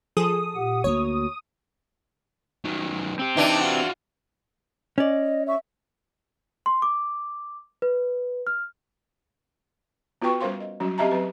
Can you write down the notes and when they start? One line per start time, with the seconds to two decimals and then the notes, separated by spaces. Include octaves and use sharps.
0.17 F3 G#4 A4 D#6
0.56 A#2 G4 F#5
0.84 D2 A3 A#3 F#4 C#5
2.65 D#3 F#3
3.19 C4 G4
3.37 E3 D4 D#4
3.61 F4 F#4
4.98 C#4 D5 D#5
5.46 E5 C#6
6.66 C6
6.82 D6
7.82 B4
8.47 F6
10.22 B3 F4 F#4 B4 G5 C#6
10.40 G3 C#4 A#4 C5 F5 C6
10.60 D#5
10.80 F#3 G3 C#4 F#4
10.98 C4 G4 D#5 E5 A5 A#5
11.11 F#3 C4 B4